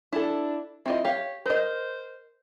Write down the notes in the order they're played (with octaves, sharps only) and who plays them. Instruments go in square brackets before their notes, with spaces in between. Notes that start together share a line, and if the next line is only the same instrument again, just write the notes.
[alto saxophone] D4 [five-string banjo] E4 A4
[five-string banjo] C4 F4 D#5 [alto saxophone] E4
[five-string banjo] G4 F5 [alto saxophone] C#5
[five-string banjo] A#4 D#5 [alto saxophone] C5